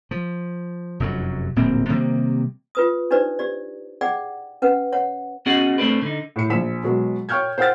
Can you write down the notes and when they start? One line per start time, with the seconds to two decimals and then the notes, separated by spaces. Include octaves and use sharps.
0.11 F3
1.00 F1 F#2 F#3
1.56 D1 A#1 A#3 C4
1.88 C3 D#3 G3 A#3
2.75 F4 B4 D#6
3.11 D4 D#4 G4 B4 C5 D5
3.39 G4 D5
4.01 G#4 D5 F#5 G5
4.62 C#4 B4 F#5
4.93 C#5 F#5
5.46 B3 C#4 F#4 G#4 D#5 F#5
5.78 A3 C4 D4 B4
6.02 D3 D#4
6.36 A2 C#7
6.50 A#1 B6 E7
6.84 B2 F#3 G#3
7.29 C#5 G5 C#6 F6 G6 G#6
7.58 C5 F#5 G5 E6 F6 A6